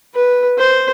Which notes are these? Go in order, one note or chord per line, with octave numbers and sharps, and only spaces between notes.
B4
C5